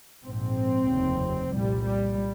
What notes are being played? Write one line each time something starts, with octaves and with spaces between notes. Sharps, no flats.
A#1 G#2 C4
F1 D#2 C#3
C2 A#2 G3
G3